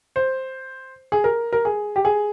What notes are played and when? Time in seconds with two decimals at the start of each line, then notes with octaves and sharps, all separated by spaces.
0.16 C5
1.12 G#4
1.24 A#4
1.53 A#4
1.65 G#4
1.96 G4
2.05 G#4